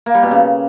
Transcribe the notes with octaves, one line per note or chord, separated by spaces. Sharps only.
A#3
G3
B2
C#3